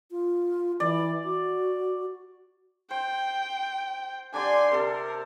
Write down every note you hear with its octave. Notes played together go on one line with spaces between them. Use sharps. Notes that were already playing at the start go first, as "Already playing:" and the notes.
F4
E3 D5
F#4
C5 G5
D3 G4 D5 G#5 C6
C3 A4 A#4